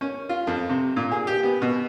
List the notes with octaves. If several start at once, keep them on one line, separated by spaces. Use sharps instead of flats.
C#4
F4
F2
C3
A#2
G#4
G4
B3
B2